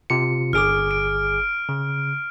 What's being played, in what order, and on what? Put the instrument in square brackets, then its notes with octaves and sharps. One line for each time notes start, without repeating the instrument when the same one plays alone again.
[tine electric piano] C3 F4 C#7
[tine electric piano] G1 G#4 D6 [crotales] F6 D7
[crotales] D7
[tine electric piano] C#3